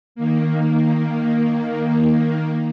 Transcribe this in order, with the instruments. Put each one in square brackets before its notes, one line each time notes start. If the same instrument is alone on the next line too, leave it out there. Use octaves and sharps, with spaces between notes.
[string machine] D#3 A#3